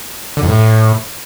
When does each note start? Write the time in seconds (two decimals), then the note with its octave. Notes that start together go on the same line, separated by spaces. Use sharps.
0.37 D3
0.43 F2
0.49 A2